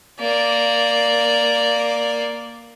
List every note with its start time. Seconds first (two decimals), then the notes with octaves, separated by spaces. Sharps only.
0.19 A#3 D5